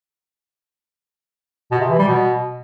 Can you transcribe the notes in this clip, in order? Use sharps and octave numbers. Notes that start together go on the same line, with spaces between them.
B2
C3
E3
G3
B2